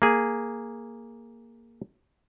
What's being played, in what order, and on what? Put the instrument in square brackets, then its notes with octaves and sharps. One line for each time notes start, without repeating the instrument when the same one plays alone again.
[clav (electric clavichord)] A#3 G#4